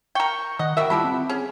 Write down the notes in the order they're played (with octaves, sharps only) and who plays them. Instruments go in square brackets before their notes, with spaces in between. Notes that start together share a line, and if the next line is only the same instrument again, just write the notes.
[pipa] A#4 G5 [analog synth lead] C#6
[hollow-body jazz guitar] D#3 [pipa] D#5 [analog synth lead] F#5
[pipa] G3 F#4 E5 [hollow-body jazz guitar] A#4 G5
[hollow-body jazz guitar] G3 E4 F4 [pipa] G4 A4 B5
[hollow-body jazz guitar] C4
[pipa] C#4 [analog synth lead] G#4